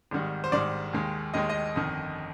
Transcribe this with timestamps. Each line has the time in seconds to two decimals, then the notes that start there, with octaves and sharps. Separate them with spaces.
0.11 G#1 G#2 D#3 G3
0.44 C5
0.52 G#1 G#2 D#3 G3 D5
0.93 D#2 D#3 G#3
1.34 D#2 D#3 G#3 D#5
1.49 D#5
1.76 G1 F2 D#3